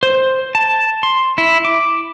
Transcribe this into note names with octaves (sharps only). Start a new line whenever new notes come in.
C5
A5
C6
E4
D6